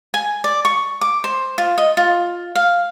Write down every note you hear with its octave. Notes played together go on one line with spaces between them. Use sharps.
G#5
D5
C#6
D6
C5
F4
D#5
F4
F5